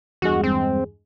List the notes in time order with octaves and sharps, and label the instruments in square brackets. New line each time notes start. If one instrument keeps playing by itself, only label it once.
[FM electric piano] E2 G2 G#3 [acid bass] F#4
[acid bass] C4